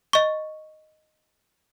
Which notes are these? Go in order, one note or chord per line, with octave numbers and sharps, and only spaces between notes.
D#5 C#6